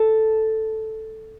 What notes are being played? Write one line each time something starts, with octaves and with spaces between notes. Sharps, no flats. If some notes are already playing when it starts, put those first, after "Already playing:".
Already playing: A4